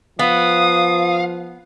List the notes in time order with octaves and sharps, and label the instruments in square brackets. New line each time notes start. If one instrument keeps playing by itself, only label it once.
[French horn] F3 [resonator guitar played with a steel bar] B3 [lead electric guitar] F5 [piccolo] D#6